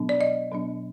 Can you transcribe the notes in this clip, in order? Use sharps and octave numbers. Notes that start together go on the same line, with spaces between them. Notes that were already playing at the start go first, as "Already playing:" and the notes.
Already playing: B2 F#3 B3 D4
D5
D#5
B2 F#3 B3 D4